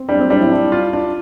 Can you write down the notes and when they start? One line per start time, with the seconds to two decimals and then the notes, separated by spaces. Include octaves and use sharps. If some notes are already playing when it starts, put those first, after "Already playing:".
Already playing: C4
0.09 G3 D4
0.20 C4
0.30 G3 D4
0.40 E4
0.51 D4
0.72 F4
0.93 D4